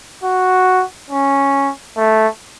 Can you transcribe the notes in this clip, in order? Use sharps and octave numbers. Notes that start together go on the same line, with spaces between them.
F#4
C#4
A3